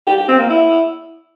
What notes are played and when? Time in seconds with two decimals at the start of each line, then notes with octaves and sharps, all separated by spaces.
0.07 G4
0.17 G4
0.28 C4
0.39 A#3
0.50 E4